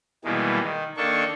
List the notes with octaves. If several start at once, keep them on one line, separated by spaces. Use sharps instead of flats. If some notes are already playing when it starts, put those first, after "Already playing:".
B2 D#3 E3 G3 G#3 A#3
D#3
D#3 A#3 D4 A4 C#6